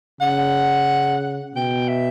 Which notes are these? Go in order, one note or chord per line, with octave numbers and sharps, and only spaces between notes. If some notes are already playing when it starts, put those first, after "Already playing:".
C#3 F#5
B2 G5
E5